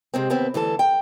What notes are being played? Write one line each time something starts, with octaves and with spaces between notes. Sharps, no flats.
C3 G#3 C4
D#2 B3 C4
D2 E3 D4 A4
G5